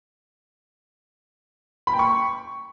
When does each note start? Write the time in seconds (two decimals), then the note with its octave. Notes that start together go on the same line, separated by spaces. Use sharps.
1.87 B5
1.93 G5
1.99 C#6